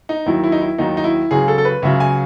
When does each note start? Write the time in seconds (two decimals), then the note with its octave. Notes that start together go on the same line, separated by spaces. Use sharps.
0.09 D#4
0.26 D#2 D#3 F#3 E4
0.44 E4
0.52 D#4
0.61 E4
0.78 D#2 D#3 F#3 D#4
0.97 D#4
1.04 E4
1.31 C#2 C#3 F#3 G#4
1.48 A4
1.58 A4
1.65 B4
1.82 C#2 C#3 F#3 E5
2.00 G#5